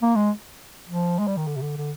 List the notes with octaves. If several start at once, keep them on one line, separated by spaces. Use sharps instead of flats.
A#3
G#3
F3
G#3
G3
D#3
D3
C3
D3
D3